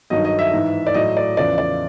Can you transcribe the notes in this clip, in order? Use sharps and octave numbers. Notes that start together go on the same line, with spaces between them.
G2 D#3 F#3 D#5
D#5
E5
G#2 E3
D5
A2 F#3 D#5
D5
E2 C#3 F3 D5
D5